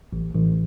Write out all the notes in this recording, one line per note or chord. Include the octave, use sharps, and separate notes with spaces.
A1
A1